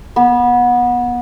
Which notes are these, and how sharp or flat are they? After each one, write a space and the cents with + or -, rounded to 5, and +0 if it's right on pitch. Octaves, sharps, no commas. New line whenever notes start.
B3 -25